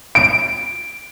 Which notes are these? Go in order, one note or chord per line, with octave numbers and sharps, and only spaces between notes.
D7